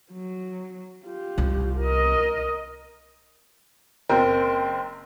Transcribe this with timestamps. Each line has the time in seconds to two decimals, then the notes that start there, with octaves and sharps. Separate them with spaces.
0.12 F#3
1.06 F4 G4
1.38 C2
1.78 A#4 D#5
4.09 F#1 C4 A#4 G5